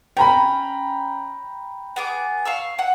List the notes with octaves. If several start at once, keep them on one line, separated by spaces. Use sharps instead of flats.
C#4 G5 A#5 B5
B3 G#4 D6
F5 C#6 E6
F#5